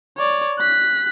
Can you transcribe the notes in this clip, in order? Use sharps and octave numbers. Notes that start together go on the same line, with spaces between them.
C#5 D5
F#6 B6